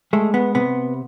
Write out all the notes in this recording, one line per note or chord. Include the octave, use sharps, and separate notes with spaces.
G#3 A3
B3
C3 B3